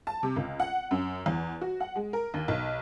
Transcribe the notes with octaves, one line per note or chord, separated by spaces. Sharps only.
A5
C3
C#2
F#5
F#2
E2
F#4
F#5
G#3
A#4
D#2
B1